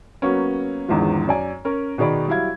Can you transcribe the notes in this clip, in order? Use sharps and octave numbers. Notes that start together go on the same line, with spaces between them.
F#3 A#3 B3 C#4
G#1 E2 G#2 D3 D#3 F3
F#2 D5 G#5
C#4 A#4
B2 D#3 G#4 D5 B5
F#3 G3 E4 F5 G#6